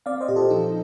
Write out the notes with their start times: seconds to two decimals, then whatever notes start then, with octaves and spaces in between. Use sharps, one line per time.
0.06 C4 D5 F5
0.21 C5 D#5
0.28 A#2 G4
0.36 F4 A4
0.50 F3 D#4